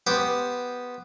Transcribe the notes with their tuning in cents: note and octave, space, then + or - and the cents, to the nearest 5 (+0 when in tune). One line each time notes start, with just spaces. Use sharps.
B3 +0 G4 +0 C5 +0